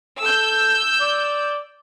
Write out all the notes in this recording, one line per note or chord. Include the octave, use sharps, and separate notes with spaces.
A4 E6 G6
D5